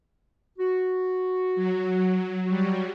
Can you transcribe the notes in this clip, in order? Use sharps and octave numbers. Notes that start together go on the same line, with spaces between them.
F#4
F#3
F#3 G3 F#4